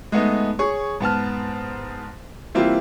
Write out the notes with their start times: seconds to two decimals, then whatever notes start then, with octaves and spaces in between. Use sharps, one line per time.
0.12 G#3 A3 B3 D#4
0.59 G#4 C#5 C#6
1.00 G#2 B3 A5 F6
2.55 E3 G3 A#3 C4 E4 F4